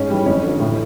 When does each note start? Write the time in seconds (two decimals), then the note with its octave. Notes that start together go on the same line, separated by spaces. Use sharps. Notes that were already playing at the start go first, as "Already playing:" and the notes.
Already playing: G#2 C#4
0.10 E3 G3
0.26 F2 C#4
0.43 D3 F3
0.60 A2